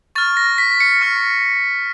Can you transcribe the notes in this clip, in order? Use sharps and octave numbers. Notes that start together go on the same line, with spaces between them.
C#6 F6 A6
A#6
B6
C#7
C#6 F6